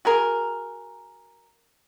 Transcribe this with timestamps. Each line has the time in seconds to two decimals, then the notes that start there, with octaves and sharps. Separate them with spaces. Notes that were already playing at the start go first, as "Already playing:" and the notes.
0.05 F#4 G#4 A#4